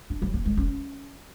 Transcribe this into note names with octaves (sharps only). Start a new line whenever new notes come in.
D4
F#3
A#3
G#3
C#4